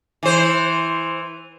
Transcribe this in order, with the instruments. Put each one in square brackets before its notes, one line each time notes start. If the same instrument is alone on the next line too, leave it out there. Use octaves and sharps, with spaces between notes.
[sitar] E3 C5